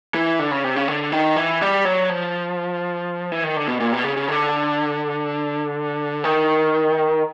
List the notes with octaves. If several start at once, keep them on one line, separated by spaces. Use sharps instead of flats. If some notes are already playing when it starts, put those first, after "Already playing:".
E3
D3
C#3
C3
C#3
D3
D#3
E3
G3
F#3
F3
E3
D#3
D3
B2
A#2
B2
C#3
C#3
D3
D#3